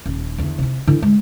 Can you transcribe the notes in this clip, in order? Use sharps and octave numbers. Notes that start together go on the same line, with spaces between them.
D#1
E2 D3
C3 E4
D3 E3
G#3